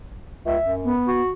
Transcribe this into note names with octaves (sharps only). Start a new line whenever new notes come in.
C#2 E5
F#2
B3
F#4